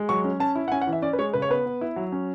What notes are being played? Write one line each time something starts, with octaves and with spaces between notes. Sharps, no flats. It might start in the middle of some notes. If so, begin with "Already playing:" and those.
Already playing: G#3
F#3 C#6
C#4
C#4 A5
E4
F#5
C#4 G#5
F#5
E3
E5
C#4 D5
B4
G#3 C#5
C#3 B4
C#5
B3 B4
B3
E4
F#3
C#4